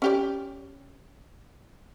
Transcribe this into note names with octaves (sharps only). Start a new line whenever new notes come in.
C#4 G4 D5